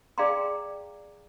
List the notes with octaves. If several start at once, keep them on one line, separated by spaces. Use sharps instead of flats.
G#4 D5 F5 G5 A#5 C6